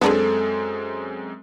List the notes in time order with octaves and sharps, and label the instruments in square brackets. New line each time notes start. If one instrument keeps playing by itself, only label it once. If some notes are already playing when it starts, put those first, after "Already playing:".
[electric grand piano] F#2 G#3 C4 [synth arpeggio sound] B3 D4 G#4 [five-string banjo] A4